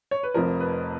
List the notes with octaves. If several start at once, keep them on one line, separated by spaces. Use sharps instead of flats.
C#5
B4
F1 F2 F3 A#4
B4